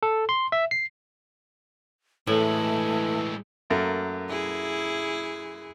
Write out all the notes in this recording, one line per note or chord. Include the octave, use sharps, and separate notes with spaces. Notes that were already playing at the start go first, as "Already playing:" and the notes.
A4
C6
E5
C7
A2 E3 G#3 A3 E4
F#2 A3 A#3
E4 G#4